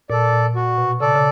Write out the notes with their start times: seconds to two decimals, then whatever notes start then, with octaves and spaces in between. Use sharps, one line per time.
0.10 A#2 D5
0.13 A4
0.33 A#2
0.55 F#4
0.78 B2
1.00 C#3 A4 D5
1.15 C#3